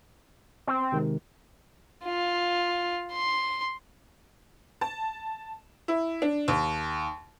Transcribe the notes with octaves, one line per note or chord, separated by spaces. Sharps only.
C4
C3 D#3 G#3
F4
C6
A5
E4
D4
D#2